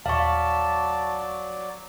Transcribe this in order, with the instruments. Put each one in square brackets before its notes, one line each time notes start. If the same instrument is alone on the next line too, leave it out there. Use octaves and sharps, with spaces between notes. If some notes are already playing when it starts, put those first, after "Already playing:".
[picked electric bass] D#1 [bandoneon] F#3 D5 [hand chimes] F5 C#6 [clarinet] A5